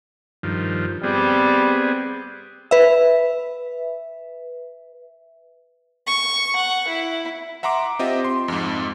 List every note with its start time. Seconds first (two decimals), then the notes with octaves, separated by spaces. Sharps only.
0.43 G2 D#3 F3
1.03 G3 B3 C4 G#4
2.71 B4 E5
6.07 C#6
6.56 F#5
6.88 E4
7.63 E5 F#5 A#5 C6 D6
7.99 C4 F4 G4 D#5 E5
8.24 C6
8.48 F2 G#2